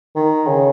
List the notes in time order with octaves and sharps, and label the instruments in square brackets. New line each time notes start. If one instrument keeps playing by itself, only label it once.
[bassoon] D#3
C#3